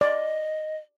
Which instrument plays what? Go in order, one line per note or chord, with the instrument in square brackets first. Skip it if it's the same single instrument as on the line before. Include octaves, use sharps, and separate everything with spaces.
[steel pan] D5 [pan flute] D#5